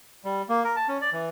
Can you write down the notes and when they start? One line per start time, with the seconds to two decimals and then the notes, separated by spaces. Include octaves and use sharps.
0.25 G3
0.49 A#3
0.64 A#4
0.76 A5
0.88 C#4
1.01 D5
1.13 E3